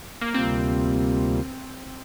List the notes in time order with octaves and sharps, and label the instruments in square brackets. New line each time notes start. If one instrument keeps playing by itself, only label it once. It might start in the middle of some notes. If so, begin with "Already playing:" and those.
[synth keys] A#3
[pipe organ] D2 C3 G3 A#3 F4 [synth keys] C4